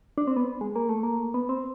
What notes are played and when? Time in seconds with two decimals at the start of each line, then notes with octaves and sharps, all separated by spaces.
0.18 D4
0.27 C4
0.37 B3
0.61 G#3
0.76 A#3
0.89 A3
1.03 A#3
1.34 B3
1.49 C4